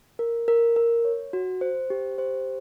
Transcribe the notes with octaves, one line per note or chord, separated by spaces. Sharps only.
A#4
A#4
A#4
C#5
F#4
C5
G4
C5